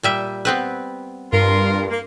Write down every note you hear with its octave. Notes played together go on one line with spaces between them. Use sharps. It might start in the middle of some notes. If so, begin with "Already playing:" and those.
A#2 G3 E5
B3 C4 B4
G2 F4 A#4
A#3